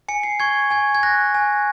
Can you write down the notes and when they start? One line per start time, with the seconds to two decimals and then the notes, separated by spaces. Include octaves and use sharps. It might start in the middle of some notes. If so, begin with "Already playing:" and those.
0.08 G#5 C#7
0.23 C7
0.40 C#6 G#6
0.71 G#5 G#6
0.95 G#6
1.03 F#6 A#6
1.35 G#5